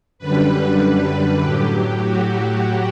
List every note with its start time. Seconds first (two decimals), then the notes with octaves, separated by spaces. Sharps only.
0.19 F#2 D3 G3 B4
0.81 B4
1.42 A2 F#3 G4
2.04 F#4